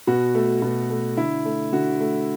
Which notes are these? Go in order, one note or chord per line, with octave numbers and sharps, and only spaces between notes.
B2 F#4
A3
B2
A3
D3 E4
A3
D3 F#4
A3